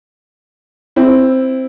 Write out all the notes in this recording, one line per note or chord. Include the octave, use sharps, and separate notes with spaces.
C4 E4